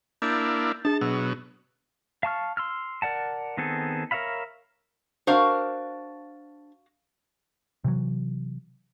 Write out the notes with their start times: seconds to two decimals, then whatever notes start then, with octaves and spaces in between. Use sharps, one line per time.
0.22 A#3 D4 E4 G6 A6
0.85 D4 G#4 A5
1.01 B2 F#3 E6
2.23 F5 A5 C#6 F6
2.57 C6 E6 F6
3.02 A#4 D5 F#5 A5
3.57 D#3 B3 C4 G#4 A4
4.11 A#4 C#5 E5 F5 B5
5.27 D4 F#4 A#4 C5 F5
7.84 C3 E3 F#3